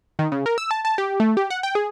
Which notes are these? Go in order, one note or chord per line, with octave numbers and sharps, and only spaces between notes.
D#3
C#3
A#4
E6
A5
A5
G4
A3
G4
F#5
G5
G#4